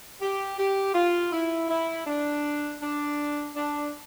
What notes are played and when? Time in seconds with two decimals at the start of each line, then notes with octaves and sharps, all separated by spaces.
0.21 G4
0.58 G4
0.94 F4
1.32 E4
1.69 E4
2.07 D4
2.81 D4
3.55 D4